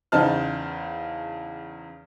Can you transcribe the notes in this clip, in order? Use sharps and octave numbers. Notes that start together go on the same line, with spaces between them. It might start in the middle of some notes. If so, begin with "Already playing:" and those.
E2 C#3 D#4 C5 A5 F6